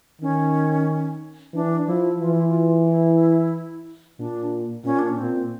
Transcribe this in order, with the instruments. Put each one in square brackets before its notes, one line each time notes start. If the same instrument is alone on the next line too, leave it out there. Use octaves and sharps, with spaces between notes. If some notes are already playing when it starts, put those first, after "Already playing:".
[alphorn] D#3 [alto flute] C#4
[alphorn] E3 [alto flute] D4
[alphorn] F3 [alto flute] E4
[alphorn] E3 [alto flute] F4
[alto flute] E4
F4
E4
[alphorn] A#2 [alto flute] D4
[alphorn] A#2 [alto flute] C#4
[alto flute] D4
C#4
[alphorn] A#2 [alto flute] C4